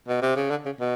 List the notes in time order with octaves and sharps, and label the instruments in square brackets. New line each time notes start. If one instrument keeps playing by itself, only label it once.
[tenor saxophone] B2
C3
C#3
D3
C#3
B2